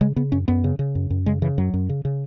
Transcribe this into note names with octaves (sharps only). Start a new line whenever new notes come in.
C#3 G#3
C#3 B3
F#2 C#4
F#2 B3
C#3
C#3
F#2
F#2
C#3 G#3
C#3 E3
F#2 F#3
F#2
C#3
C#3